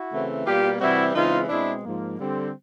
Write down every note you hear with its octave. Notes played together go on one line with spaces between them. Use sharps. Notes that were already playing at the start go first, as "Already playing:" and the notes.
Already playing: E4 F#4
C#3 E3 A3 C4
B2 G3 A#3 F4 G4
C3 E3 G3 C4 E4 F#4
C#3 E3 G#3 C4 D#4 F4
B2 G#3 C4 D4 E4
G#2 F3 A#3
D3 G3 C4